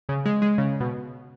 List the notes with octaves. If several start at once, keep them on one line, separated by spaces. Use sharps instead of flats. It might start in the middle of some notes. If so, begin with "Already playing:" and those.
C#3
G#3
G#3
C#3
B2